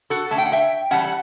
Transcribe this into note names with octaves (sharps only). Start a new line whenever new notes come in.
F#4 A4
D3 A3 C#4 A5
G5
F#5
E5 G5
E3 G3 C#4 F#5 A5
F#5